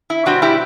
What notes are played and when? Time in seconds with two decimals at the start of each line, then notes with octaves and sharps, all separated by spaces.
0.10 E4
0.26 B2 G3 C4 D4 F#4
0.42 E4 G4